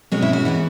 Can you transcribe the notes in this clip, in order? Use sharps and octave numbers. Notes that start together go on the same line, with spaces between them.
B2 G#3 C#4 F#4
E4
F#4
E3 B3 E4